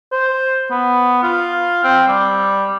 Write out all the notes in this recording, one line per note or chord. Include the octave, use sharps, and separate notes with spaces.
C5
B3
F4
C4
G3